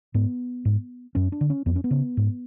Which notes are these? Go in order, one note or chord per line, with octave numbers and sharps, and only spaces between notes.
G#2 B3
G#2
F#2 C#4
D4
D3
C#4
F2 B3
C#4
B3
C#3
G#2